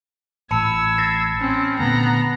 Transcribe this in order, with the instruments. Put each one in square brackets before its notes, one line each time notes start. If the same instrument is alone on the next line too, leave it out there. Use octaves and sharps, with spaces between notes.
[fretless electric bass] A1 A2 [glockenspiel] A5 B5 C#7 [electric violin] E6 G#6
[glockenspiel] A6 A#6 C7
[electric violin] C4 C#4
[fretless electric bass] A#2 D3 A3 [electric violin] B3 A#5